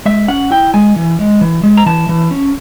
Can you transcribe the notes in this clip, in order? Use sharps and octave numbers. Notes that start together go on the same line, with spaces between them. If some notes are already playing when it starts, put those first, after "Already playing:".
G#3 E5
C#4 F#5
E4 G5
G#3 G#5
E3
G#3
E3
G#3
A#5
E3 A5
E3
C#4